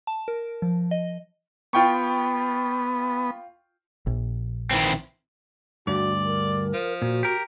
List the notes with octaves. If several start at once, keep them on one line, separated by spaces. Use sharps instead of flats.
A5
A#4
F3
D#5
B3 F4 G5 C#6
A#1
D#3 E3 C4
D2 G2 F#4 D5
A#4
F3
A#2 F#4
G4 A#4